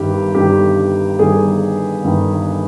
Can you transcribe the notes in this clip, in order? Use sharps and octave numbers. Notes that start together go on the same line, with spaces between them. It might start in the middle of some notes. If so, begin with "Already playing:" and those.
Already playing: G1 G2 D#3 G4
G1 G2 D#3 G4
G1 G2 D#3 G#4
G1 G2 D#3